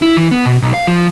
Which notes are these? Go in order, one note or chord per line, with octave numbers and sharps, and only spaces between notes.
E4
E3
B3
B2
B1
F5
F3